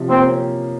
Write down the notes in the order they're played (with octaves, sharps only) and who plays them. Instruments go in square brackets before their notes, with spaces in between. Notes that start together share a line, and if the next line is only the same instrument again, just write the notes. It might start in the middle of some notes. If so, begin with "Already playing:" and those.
Already playing: [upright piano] C3 F3 C#4
[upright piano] A#3 [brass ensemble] C4
[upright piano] C#4